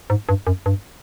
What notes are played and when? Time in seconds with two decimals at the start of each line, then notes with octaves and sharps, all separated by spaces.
0.10 G#2
0.29 G2
0.47 F#2
0.66 G2